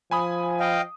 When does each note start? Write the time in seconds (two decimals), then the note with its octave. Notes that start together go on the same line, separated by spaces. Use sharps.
0.11 F3 G#5 B5 D#6
0.60 D#5 F5 G5